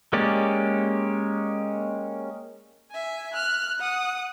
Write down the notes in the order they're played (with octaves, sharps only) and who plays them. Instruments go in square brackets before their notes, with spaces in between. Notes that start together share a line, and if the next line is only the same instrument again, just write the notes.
[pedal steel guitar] G#3 A#3 C#4 G4 D5
[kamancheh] E5 G#5
F6 F#6
F#5 D#6